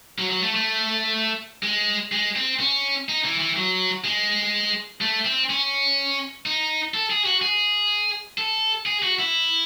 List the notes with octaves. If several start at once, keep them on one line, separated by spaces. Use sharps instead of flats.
F#3
F#3
A3
A3
G#3
G#3
C4
C#4
D#4
E3
E3
F#3
G#3
A3
C4
C#4
D#4
A4
G#4
F#4
G#4
A4
G#4
F#4
E4